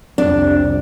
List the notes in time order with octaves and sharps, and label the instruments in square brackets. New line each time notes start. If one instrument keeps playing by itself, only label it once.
[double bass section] C2 F2 C3 [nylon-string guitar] D4